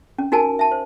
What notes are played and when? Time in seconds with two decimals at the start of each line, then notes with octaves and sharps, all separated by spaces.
0.19 C#4
0.32 D#4 F#4 A#4 G#5 A5
0.59 E5 A5
0.72 C5